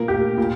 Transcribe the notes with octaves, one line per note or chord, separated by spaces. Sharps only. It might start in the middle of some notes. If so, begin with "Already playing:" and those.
Already playing: A#2 A#3 A#4
G4
A#2